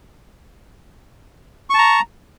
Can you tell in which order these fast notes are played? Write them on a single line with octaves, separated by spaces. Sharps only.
C#6 A5 A#5